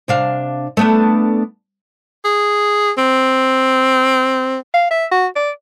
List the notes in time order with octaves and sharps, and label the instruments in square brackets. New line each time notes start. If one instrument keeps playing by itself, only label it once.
[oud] C3 D4 F5
A3 B3 D4
[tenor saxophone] G#4
C4
[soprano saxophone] F5
E5
F#4
D5